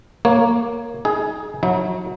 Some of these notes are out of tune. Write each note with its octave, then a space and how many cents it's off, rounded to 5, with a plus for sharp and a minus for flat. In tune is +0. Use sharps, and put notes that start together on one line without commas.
A#3 +0 C#5 +0
D#4 +25 G#4 +15
F#3 -25 D#4 +40